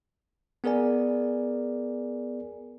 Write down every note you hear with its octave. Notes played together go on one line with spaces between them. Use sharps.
B3 G#4 A#4 D5 G#5